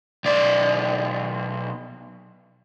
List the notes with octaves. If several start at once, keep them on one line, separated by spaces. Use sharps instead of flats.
B1 D5